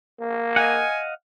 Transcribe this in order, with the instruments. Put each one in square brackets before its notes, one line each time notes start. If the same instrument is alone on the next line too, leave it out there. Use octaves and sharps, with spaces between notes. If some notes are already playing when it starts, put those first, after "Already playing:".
[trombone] A#3
[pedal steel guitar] D#5 F5 F#5 [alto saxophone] G#5